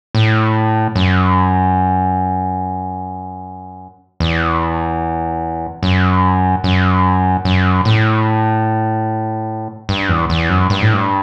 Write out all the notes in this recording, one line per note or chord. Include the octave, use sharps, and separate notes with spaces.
A2
F#2
E2
F#2
F#2
F#2
A2
G2
E2
E2
F#2
G2
A2
G2